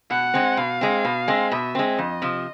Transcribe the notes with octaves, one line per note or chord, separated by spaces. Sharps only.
B2 F#5
G#3 C4
B2 F5
G#3 C4
B2
G#3 C4
B2 E5
G#3 C4
F2 D#5
C3 F3